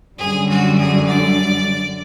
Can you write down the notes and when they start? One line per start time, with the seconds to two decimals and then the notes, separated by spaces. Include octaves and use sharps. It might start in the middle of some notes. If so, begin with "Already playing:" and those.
0.18 F#2 D3 G3 G#4
0.49 F#4
0.77 G#4
1.07 D5